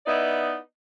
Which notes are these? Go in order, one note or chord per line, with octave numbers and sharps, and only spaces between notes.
B3 D#4 E4 D5 D#5